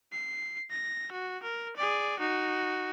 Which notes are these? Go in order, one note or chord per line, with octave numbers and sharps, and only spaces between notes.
C7
A#6
F#4
A#4
G#4 D5
D#4 F#4